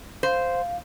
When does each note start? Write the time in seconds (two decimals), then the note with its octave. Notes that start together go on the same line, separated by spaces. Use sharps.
0.23 C5 F5